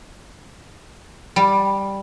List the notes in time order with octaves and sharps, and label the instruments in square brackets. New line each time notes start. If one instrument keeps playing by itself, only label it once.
[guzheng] G3